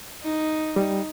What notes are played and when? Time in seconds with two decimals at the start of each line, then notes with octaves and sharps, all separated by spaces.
0.23 D#4
0.76 G3